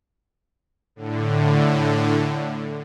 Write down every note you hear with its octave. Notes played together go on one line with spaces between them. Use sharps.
A2 D3